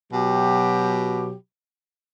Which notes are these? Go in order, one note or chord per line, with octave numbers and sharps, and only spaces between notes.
B2 F#3 G4